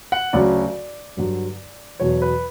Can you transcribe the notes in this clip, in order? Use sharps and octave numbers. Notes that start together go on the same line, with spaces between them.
F#5
D2 C#3 F#3 D5
G2 D3 F#3
E2 B2 F#3 C#5
B4